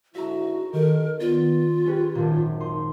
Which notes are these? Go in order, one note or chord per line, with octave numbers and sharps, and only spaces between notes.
G#2 D3 E4 F#4 E5 A#5
D#3 G4 A4 A#4 D#5
B3 F4 D5 A6
C#4 G4 G#4 B4
G#1 F#2 A#2
D#4 C6